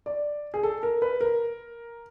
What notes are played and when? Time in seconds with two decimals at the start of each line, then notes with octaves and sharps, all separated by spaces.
0.06 D5
0.54 G#4
0.63 A4
0.83 A#4
1.02 B4
1.21 A#4